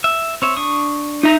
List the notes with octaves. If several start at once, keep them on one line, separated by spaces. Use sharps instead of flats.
E5
C4 C#5 E5
D4 C#6 D#6
D#4 E5 A#5